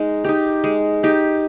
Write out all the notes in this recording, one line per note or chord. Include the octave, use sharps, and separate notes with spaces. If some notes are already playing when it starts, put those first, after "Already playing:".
Already playing: G#3 D#4
D#4 G4
G#3
D#4 G4